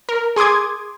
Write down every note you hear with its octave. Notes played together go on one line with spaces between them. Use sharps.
A#4
G#4 C6 D6 D#6 G#6